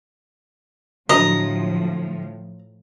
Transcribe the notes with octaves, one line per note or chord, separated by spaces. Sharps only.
A2 D3 F3 F#3 D#5 A#5